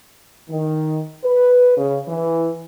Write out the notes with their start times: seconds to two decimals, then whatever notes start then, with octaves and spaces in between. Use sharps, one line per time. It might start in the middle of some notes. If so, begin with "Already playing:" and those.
0.50 D#3
1.25 B4
1.78 C#3
2.08 E3